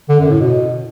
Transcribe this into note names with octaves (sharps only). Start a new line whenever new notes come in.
D3
F#2
A2
B2